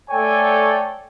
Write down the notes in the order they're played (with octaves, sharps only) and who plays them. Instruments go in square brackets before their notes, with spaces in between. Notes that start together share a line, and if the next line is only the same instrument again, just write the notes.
[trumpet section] A3 A4 C#5 D5 G5 G#5